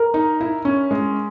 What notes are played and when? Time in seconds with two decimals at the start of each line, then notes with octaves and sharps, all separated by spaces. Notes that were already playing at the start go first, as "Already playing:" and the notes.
Already playing: A#4
0.14 D#4
0.40 E4
0.65 C#4
0.91 G#3